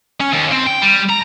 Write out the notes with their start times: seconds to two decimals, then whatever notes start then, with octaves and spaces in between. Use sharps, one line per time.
0.20 C#4
0.32 D#2
0.51 C4
0.66 G5
0.82 G3
1.10 A#5